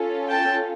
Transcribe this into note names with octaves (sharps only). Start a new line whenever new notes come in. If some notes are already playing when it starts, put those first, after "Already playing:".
Already playing: C#4 F4 A4
G5 A5